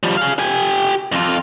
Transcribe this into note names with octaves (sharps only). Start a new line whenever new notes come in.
F3 G3
G#4 F5
G4 G#5
F2 F4